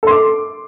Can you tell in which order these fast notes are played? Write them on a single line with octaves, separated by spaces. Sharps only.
A4 C6 D6